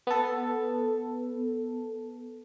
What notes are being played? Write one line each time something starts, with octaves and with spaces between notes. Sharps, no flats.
B3 A4